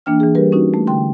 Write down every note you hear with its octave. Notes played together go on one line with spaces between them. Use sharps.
E3 A#3 D4 G5 F6
E3 G#4
G3 G4 A#4 B4
C#4 D#4 F#4
A3
D3 G5 C6